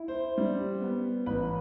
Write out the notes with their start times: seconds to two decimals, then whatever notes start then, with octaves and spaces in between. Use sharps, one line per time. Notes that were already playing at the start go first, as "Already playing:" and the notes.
Already playing: E4
0.08 C5
0.38 G3
0.81 B3
1.26 A1 B4